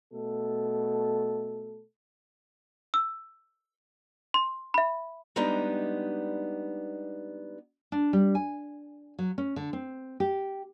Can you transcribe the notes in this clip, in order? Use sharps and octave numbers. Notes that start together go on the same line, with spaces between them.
B2 A3 A4
E6
C6
E5 B5
G3 G#3 B3 D4 D#4 G4
D4
G3
G#5
F#3
C#4
D3
C4
G4